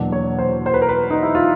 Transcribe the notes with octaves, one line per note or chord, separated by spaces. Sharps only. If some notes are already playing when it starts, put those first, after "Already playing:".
Already playing: E2 B2 F#3 A#3 D4
C#5
C5
C5
B4
A#4
B4
D#4
E4
F4